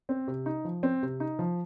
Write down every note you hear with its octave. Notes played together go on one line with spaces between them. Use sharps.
C4
C3
D#4
F3
C4
C3
D#4
F3